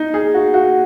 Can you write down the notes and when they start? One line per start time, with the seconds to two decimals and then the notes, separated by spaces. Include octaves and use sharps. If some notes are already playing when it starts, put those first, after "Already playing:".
Already playing: D#4
0.14 G#4
0.34 F#4
0.54 F#4